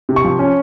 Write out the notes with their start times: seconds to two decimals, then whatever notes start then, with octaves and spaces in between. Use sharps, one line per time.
0.09 C3
0.16 C#6
0.25 F3
0.39 C#4